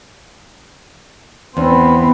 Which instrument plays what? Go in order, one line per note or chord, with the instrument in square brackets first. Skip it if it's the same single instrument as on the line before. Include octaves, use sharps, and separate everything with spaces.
[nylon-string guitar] E2 [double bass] B3 C4